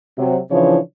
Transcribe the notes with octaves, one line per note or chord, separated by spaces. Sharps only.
C3 F#3
C#3 E3 F3 D4 E4 C#5